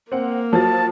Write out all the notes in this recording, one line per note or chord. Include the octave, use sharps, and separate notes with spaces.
A#3 C4 F#5
F3 F#3 A5 A6